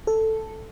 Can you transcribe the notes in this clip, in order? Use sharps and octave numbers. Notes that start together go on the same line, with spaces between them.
A4